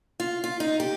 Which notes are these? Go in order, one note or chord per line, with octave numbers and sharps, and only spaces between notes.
F4
F4
D#4
G4